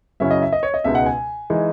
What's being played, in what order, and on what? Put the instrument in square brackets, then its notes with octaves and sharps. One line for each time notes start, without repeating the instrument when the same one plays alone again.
[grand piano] F#2 C#3 F#3 C#4 E4 E5
D#5
E5
D#5
C#5
D#5
C#2 B2 G#3 D#4 E5
F#5
G#5
E3 G#3 D#4